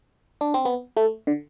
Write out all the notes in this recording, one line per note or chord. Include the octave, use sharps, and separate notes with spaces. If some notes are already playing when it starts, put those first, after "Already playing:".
D4
C4
B3
A3
D3